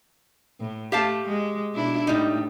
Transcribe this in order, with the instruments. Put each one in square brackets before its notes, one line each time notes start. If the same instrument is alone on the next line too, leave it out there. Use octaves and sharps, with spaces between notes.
[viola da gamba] A2
[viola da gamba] A3 [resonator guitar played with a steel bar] G4 F5 A5
[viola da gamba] G#3
B2 D4 E4
[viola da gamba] A2 [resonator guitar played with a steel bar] G3 D#4